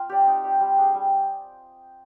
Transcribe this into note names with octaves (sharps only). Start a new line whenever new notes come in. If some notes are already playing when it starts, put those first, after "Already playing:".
Already playing: C4 F4
G4 D5
D#4
G4 D5
G3
D4 G#4
G3